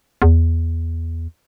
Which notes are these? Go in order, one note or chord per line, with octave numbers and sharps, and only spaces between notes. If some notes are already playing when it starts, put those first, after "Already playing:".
E2